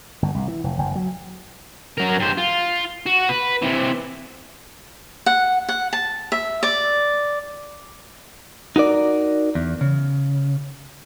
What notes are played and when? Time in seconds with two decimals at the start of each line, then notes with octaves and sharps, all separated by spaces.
0.22 G1
0.35 C2
0.48 E3
0.64 F1
0.78 F#1
0.95 F#3
1.98 F#3 A#4
2.20 G2 C5
2.37 F4
3.06 F#4
3.29 B4
3.62 C3 E3
5.26 F#5
5.69 F#5
5.93 A5
6.32 E5
6.63 D5
8.76 D#4 F#4 A#4 D5
9.55 E2
9.81 C#3